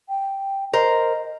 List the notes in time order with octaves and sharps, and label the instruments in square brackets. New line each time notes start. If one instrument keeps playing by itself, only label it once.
[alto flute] G5
[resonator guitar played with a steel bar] A#4 C5 [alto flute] D#5